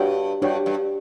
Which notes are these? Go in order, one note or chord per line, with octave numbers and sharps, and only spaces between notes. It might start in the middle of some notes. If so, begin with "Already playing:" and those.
Already playing: G2 D4 F#4 C#5 G5
G2 D4 F#4 C#5 G5
G2